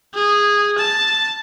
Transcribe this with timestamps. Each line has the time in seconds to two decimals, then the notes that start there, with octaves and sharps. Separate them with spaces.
0.15 G#4
0.78 A5